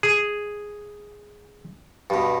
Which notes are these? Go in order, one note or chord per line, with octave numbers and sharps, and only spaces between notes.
G#4
G2 B2